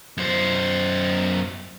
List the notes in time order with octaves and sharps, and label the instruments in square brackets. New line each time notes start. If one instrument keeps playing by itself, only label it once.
[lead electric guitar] F#2 C5